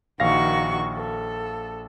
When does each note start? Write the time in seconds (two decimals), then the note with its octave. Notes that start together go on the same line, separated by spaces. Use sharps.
0.20 A#1 D#3 F#4 F5 C#6 A#6
0.97 A4